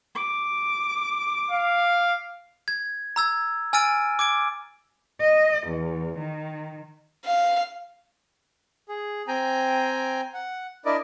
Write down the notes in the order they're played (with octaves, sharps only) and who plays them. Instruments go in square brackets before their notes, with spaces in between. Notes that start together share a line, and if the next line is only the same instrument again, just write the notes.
[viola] D6
[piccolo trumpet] F5
[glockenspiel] G#6
A#5 E6 G#6
G#5 E6 F6 A6 D7 D#7
D6 G#6 D7
[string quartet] D#5
E2
D#3
[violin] F5
[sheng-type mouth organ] G#4
C4 G5 G#5 A#5
F#5
D4 E4 A#4 D5 D#5